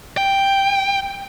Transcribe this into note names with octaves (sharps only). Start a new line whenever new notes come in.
G5